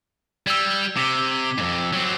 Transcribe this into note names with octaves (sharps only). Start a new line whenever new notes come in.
G3 E6 G#6
C3 D6 B6 G7
F2 G#2
F#3 C4